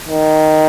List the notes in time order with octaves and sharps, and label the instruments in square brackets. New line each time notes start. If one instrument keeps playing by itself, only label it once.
[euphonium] D#3